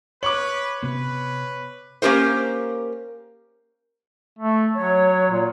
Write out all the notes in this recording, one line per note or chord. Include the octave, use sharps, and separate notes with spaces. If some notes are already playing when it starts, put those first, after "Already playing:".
B4 C#5 C#6 D6 F#7
C3 B3 B4
A#3 C#4 G4 A#4 C5
A3
F#3 C#5
A#2